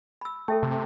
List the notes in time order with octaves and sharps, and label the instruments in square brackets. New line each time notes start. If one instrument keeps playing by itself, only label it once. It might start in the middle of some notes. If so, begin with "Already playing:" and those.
[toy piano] B5 E6
[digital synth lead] A3 [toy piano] A4 E5 G5
[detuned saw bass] C3